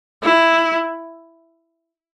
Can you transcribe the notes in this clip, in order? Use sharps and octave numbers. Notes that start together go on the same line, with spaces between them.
E4